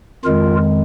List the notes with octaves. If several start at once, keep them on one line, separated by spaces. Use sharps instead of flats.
F2 D#3 G#3 F4 A#4